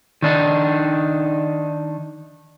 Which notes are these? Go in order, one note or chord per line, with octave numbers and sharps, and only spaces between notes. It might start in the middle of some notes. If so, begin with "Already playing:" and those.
D#3 D4 D#4